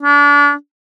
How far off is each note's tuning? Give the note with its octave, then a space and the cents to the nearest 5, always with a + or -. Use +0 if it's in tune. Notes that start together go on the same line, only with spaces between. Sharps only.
D4 -30